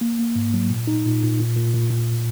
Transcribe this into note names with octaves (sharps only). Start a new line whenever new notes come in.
A#3
A#3
G#2
F#3
A#2
D#4
A#2
A#2
A#2
A#2
A#2
A#2